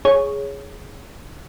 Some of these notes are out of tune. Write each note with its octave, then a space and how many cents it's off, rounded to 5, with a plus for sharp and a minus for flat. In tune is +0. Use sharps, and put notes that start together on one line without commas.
G#4 +0 C#5 +0